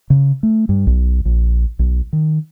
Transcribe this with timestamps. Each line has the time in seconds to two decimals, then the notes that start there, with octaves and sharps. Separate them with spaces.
0.10 C#3
0.43 A3
0.69 G2
0.87 B1
1.25 A#1
1.79 B1
2.13 D#3